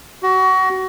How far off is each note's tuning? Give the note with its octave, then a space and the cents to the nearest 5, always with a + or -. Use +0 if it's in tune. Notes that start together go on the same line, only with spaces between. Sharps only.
F#4 +25